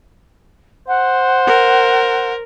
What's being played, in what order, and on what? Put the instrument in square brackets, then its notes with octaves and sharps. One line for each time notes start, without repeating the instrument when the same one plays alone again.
[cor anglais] C5 [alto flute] F#5
[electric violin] A#4